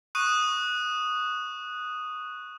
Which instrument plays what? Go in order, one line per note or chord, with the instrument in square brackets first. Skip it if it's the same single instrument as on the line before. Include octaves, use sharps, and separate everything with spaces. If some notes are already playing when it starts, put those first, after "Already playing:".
[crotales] C#6 D#6 F#6 D#7